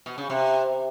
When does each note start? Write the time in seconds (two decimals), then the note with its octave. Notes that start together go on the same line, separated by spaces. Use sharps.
0.06 B2
0.18 C#3
0.30 C3